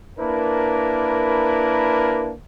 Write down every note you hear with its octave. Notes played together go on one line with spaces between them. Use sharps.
A#3 D4 E4 A#4 B4